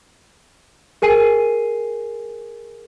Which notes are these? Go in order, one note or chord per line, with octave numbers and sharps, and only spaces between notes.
G#4 A#4 G#5 C7 D#7